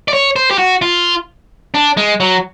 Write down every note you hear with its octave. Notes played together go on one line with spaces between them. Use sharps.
D5
C#5
C5
G4
F#4
F4
D4
G#3
F#3